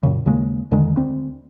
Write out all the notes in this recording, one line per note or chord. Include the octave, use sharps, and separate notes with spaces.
F#2 A#2 C#3
D#2 C#3 G#3 A#3
E2 D3 D#3 G#3
D2 C4